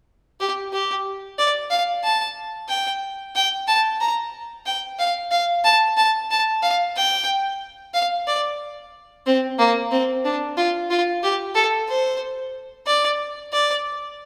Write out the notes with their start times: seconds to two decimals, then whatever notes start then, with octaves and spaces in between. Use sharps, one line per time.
0.40 G4
0.73 G4
1.39 D5
1.70 F5
2.04 A5
2.69 G5
3.35 G5
3.67 A5
4.00 A#5
4.67 G5
4.99 F5
5.31 F5
5.64 A5
5.97 A5
6.31 A5
6.63 F5
6.96 G5
7.94 F5
8.28 D5
9.26 C4
9.59 A#3
9.91 C4
10.25 D4
10.57 F4
10.90 F4
11.23 G4
11.55 A4
11.89 C5
12.87 D5
13.53 D5